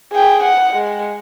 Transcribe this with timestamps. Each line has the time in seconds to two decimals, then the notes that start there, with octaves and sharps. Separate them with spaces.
0.13 G#4 G5
0.43 F#5
0.73 G#3